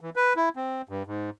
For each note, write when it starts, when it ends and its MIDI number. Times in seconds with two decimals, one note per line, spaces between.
0.01 0.10 52
0.16 0.33 71
0.36 0.49 64
0.56 0.82 60
0.89 1.03 43
1.06 1.30 44